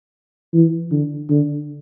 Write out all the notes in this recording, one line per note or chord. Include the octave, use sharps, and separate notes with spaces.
E3
D3
D3